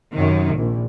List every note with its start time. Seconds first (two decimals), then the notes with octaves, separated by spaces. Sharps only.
0.13 F#2 C3 D#3
0.55 A#1